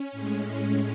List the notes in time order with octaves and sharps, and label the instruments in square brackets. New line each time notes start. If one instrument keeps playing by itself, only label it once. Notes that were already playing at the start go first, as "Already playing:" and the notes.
Already playing: [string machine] C#4
A2 G#3
C#4